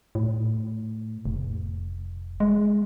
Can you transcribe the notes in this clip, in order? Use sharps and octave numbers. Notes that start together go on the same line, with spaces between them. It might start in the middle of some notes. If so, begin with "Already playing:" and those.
A2
F1
G#3